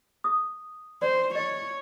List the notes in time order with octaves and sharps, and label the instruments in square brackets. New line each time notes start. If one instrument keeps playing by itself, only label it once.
[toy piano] D#6
[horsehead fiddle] C5 [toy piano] D5
[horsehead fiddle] C#5 [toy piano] D#5